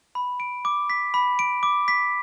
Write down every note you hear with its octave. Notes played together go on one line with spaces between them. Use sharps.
B5
D7
D6
B6
B5
D7
D6
B6